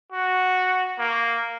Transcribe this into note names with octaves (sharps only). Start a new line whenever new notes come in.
F#4
A#3